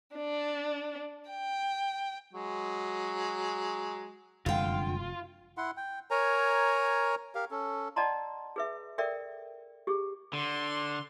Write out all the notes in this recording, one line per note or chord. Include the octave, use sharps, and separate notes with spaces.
D4
G5
F#3 G#3
F1 F#2 D3 G3 G#3 F4 G5
E4 F#5 C6
G5
A#4 C#5 G#5 A#5
G4 A#4 F5
C#4 A4
D5 D#5 F#5 A5 A#5 C6
G#4 B4 E5
A4 A#4 D5 E5 G5
G4 G#4
D3 C6